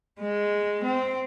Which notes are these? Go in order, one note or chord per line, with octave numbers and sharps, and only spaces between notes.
G#3
C4